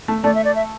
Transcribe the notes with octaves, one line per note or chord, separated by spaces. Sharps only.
A3
A3 D5
E5
D5
E5